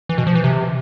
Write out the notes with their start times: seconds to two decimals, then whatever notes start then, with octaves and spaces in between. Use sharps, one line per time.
0.09 E3
0.18 B2
0.27 F3
0.35 E3
0.44 C3